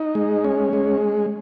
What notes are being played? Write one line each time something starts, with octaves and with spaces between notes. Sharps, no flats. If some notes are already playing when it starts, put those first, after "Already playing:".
Already playing: D#4
G#3
C#4
G#3